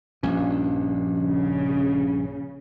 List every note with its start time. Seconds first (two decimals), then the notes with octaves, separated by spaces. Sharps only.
0.23 A#1 G2 F3 C#4
1.17 C#3